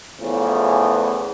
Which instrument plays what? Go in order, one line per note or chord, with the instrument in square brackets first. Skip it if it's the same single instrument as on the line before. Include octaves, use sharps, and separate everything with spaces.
[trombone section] E2 A2 C#3 F3